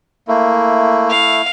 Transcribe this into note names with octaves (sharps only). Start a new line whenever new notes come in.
A3 A#3 E4
F5